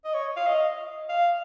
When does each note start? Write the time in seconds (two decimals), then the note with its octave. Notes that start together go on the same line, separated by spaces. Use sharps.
0.05 D#5
0.14 C#5
0.36 F5
0.46 D#5
1.09 F5